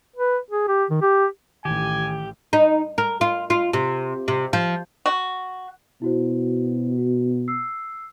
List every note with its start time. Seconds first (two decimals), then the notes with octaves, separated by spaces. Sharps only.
0.16 B4
0.51 G#4
0.68 G4
0.90 D#3
1.02 G4
1.65 A1 D#3 G4 G#5
2.53 D#4
2.98 A#4
3.21 F4
3.50 F4
3.73 C3
4.28 C3
4.53 F3
5.06 F#4
6.02 B2 E4 F#4 C5
6.98 F#4
7.48 E6 C7